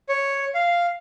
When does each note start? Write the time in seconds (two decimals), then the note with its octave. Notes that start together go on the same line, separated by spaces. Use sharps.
0.09 C#5
0.54 F5